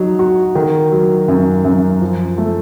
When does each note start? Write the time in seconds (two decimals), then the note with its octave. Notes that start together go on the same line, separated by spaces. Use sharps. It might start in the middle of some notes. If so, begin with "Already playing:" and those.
Already playing: F#3 D#4
0.19 F#4
0.55 D#3
0.92 F#3
1.28 F#2
1.65 F#2
2.01 F3
2.38 A3